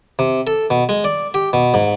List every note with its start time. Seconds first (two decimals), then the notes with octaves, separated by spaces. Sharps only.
0.19 C3
0.47 A4
0.70 B2
0.89 G#3
1.04 D5
1.34 G4
1.53 B2
1.74 G#2